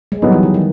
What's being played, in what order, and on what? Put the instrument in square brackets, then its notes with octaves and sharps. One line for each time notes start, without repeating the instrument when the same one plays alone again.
[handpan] G#3
[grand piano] F#3 B3 D#4 [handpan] G3
[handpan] E3
D#3
D#3